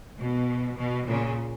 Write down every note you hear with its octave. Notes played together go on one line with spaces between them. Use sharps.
B2
B2
A#2 C#3